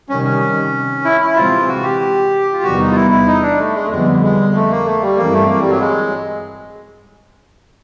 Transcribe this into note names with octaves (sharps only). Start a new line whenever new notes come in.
C3 D#3 G3 C#4
C#4
E4
E4
C3 E3 G#3 C4 F4
F#4
G4
F4
E2 C3 D#3 G3 B3 F#4
D#4
F4
E4
E4
D#4
D4
A3
G#3
A3
F2 D3 G3 G#3 B3
G#3
A3
A#3
A3
G3
G2 E3 G#3 A#3 C4
A3
A#3
G3
F#3
G#3